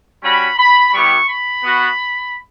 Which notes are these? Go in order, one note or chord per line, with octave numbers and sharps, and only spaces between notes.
G3 C#4 F#4 B5
B5
G3 B3 E4 G4 C#6
B5
B3 F#4